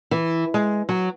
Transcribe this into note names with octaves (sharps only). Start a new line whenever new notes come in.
E3
G#3
F#3